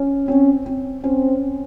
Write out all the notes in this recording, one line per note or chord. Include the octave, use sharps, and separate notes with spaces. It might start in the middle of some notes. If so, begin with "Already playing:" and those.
Already playing: C#4
C4 C#4
C4
C4 C#4